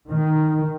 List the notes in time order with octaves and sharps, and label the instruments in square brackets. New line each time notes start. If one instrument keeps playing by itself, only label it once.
[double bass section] D#3